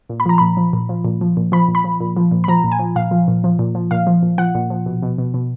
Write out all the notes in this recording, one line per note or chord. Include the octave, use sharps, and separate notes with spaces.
A#2
B5
F3 A#5
A#2 B5
F3
A#2
F3
A#2
F3
A#2
F3 B5
A#2
B5
F3
A#2
F3
A#2
B5
F3 A#5
A#2
G#5
F3
A#2 F5
F3
A#2
F3
A#2
F3
A#2 F5
F3
A#2
F3 F#5
A#2
F3
B2
B2
B2
B2